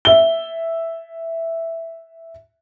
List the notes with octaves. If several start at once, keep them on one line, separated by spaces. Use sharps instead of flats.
E5 G7